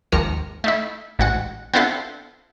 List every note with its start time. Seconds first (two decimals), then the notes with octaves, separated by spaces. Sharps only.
0.12 G#1 D#2 F3 A#4 A#6 C#7
0.64 A3 D#4 E4
1.19 A1 G#2 F#4 F#5
1.74 B3 C4 D4 E4 F4 A4